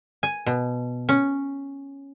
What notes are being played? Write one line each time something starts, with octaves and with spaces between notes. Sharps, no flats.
G#5
B2
C#4